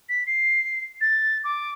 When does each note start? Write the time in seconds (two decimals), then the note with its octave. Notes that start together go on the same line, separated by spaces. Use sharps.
0.09 B6
0.27 C7
1.01 A6
1.44 D6